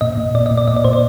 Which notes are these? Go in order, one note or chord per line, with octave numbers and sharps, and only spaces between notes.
A#2 D#5
A#2
A#2 D5
D#5
A#2
D5
A#2 D#5
D5
A#2 C5
D5